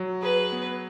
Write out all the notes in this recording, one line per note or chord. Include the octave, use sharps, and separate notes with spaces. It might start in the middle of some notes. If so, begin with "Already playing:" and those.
Already playing: F#3
G#4 B4
B3